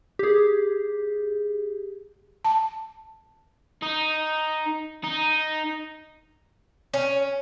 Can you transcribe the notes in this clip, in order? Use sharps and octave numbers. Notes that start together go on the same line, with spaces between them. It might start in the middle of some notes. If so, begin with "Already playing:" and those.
G4 G#4
A5
D#4
D#4
C#4